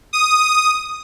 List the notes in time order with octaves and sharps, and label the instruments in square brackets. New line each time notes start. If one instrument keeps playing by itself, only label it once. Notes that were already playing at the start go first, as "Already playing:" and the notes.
[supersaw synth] D#6